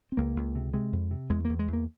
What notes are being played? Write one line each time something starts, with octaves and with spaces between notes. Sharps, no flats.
C4
C#2 A#3
C#2
C3
C3 G#3
F2
C3
E2 G#3
E2 A#3
G#3
E2
A#3